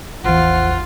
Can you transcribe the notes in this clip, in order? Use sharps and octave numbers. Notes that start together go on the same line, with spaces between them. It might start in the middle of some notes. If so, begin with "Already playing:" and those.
A1 E2 F3 F4 F#5